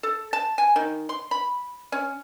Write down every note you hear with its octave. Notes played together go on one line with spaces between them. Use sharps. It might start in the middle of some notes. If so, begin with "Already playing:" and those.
A4
A5
G#5
D#3
C6
B5
C#4